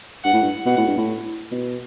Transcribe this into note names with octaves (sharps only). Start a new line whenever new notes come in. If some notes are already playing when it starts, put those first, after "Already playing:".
G2 F#5
A2
G2
B2 F#5
A2
G2
A2
B2